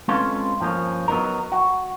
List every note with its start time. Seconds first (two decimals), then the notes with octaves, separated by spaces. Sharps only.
0.08 G#3 C4 C#4 F4 A4 B4
0.60 G2 F3 A#3 C#4
1.08 F#3 B3 D#4 A#4
1.52 F#4